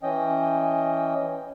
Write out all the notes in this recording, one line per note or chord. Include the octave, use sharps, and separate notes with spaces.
E3 C#4 D#5 G5